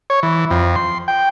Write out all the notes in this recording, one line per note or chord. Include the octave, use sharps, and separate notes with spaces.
C#5
E3
F2
C6
G5